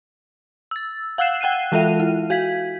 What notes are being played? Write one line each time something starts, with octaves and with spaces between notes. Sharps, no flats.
E6 A6
F5 F#5 E6 F#6 C7 E7
F#5 G5 F#6 C7 D#7
E3 G#3 F4 A4 E5 D#7
E4
F#4 F5 G#6 B6